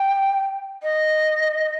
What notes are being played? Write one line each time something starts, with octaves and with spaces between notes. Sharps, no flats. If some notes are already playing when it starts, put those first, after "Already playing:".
Already playing: G5
D#5